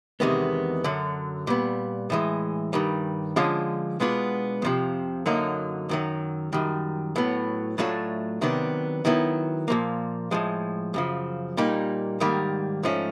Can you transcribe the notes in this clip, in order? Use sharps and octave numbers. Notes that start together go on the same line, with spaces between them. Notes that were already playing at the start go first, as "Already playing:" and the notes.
E2 C3 D#3 G#3 B3
F#2 D3 F#3
A#2 G3 B3
A2 E3 G#3
G2 D#3 G3
D3 F3 G#3 C#4 F4
B2 G#3 B3 D4 F4
F2 C3 F3
F#2 D3 F#3 A#3 D#4
F#2 D#3 F#3
F#2 D#3 G3
A2 F#3 B3
A2 F#3 A3 D4 F4
C3 D#3 F#3 B3 D4
D#3 F#3 B3 E4
A#2 F3 A#3
A2 F3 G#3
F#2 C#3 F3
A#2 G3 A#3 D#4
G#2 D#3 G3 A#3
G#2 F3 A3 C#4